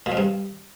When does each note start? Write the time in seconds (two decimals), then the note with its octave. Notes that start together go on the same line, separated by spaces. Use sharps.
0.06 A#2
0.12 F2
0.17 G2